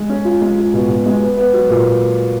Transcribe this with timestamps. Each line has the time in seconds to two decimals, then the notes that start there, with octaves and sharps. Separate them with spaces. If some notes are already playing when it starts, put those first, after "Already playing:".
Already playing: G#3
0.09 C#4
0.25 F4
0.41 G#3
0.57 F4
0.74 B2
0.89 B2
1.06 G#3
1.21 B3
1.37 B3
1.54 F#3
1.69 A#2